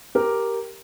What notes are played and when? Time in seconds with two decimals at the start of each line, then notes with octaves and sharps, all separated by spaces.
0.15 G4 A#4